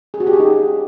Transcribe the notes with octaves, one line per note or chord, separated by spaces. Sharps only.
G#4
F#4
G4
G#4
D#4